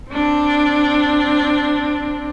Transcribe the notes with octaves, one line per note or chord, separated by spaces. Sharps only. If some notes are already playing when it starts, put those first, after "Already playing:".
C4 D4